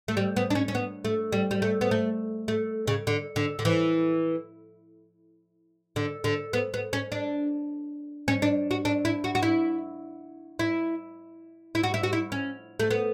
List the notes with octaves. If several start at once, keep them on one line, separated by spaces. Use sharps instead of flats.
A3
G3
B3
D4
C#4
C#4
B3
A3
G3
G3
A3
B3
A3
A3
C#3
D3
D3
D3
E3
D3
D3
B3
B3
C#4
D4
C#4
D4
F#4
D4
E4
F#4
F#4
E4
E4
E4
F#4
E4
F#4
E4
C#4
A3
B3